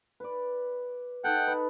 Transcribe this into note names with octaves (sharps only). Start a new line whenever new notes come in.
B4 D5
D#4 A4 F#5 G5
B4